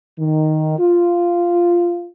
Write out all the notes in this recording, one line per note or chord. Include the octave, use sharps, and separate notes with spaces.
D#3
F4